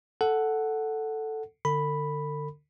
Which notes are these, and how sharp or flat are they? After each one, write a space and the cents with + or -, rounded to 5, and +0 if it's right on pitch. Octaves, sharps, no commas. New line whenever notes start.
A4 +0 F#5 +0
D3 +0 A4 +45 B5 +0